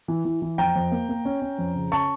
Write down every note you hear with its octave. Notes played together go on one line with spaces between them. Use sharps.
E3
E3
E3
F2 G5 A#5
F2
A#3
A#3
C#4
C#4
F2
C#3
C#4 A5 C#6